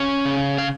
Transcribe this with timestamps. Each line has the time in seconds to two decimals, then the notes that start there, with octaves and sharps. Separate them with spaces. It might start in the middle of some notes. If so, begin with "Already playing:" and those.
Already playing: C#4 F5
0.25 C#3
0.58 F5